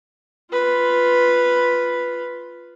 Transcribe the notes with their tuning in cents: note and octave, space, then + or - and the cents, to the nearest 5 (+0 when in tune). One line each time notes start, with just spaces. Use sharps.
F4 +0 B4 +0